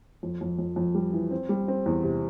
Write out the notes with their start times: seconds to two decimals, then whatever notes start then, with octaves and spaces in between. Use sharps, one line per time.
0.23 F2
0.41 F2
0.59 F2
0.76 F2
0.95 G3
1.13 E3
1.31 C4
1.49 G3
1.68 C4
1.86 E2
2.04 C3